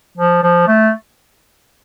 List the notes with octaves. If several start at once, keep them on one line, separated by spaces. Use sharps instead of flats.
F3
F3
A3